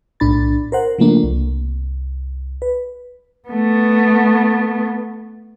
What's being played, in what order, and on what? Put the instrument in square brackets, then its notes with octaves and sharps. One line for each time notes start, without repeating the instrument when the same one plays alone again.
[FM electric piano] B1 A2 D4 B5 A6
A#4 C5 F#5
C#3 F3 A3 A#3 D4
C2
B4
[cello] A3 B3